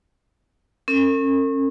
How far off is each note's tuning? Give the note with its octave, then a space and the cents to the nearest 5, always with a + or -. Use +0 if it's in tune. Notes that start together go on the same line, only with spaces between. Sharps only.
C#4 -30 A#4 -45